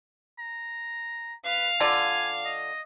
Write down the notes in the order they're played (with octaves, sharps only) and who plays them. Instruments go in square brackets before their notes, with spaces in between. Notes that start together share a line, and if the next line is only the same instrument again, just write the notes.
[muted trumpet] A#5
[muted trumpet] B4 [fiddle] F5
[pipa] D3 F4 D5 [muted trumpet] G#5
[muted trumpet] D#5